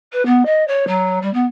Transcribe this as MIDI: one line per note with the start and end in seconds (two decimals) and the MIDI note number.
0.12 0.25 71
0.25 0.45 59
0.45 0.65 75
0.67 0.86 73
0.87 1.19 54
1.22 1.32 55
1.33 1.45 59